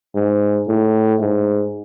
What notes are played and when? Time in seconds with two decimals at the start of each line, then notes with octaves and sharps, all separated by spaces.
0.15 G#2
0.68 A2
1.21 G#2